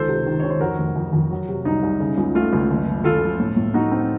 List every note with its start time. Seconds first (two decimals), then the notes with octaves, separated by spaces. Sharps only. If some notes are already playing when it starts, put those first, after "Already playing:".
Already playing: C#2 D#3 A4 C5
0.09 C3
0.26 D#3
0.40 D#3 C#5
0.50 C5
0.61 F2 F#4 A#4
0.79 F1
0.96 F2
1.13 F2
1.31 F#3
1.48 C3
1.65 C2 D#4
1.83 C2
2.00 C#3
2.18 C#2
2.35 A3 F4
2.53 C#2
2.70 F#1
2.88 F#1
3.04 F#1 F4 A4
3.22 F3
3.39 A2
3.57 A2
3.74 A2 D#4 F#4
3.92 C4